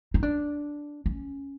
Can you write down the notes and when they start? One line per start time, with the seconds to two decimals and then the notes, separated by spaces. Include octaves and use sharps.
0.14 D#4
0.23 D4
1.06 C#4